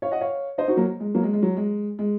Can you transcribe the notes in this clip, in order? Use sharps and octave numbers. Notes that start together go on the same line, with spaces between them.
C#5 F5
D#5 F#5
C#5 F5
C5 D#5
D#4 F#4
F#3 A#3
G#3
F#3 A#3
G#3
G#3
F#3
G#3
G#3